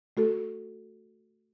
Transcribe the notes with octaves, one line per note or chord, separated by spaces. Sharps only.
A3 F#4 A4